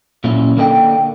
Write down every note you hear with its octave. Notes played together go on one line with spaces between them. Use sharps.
A#2 F#3 C#4 E4
D3 A#3 D#4 G#4 D#5 G5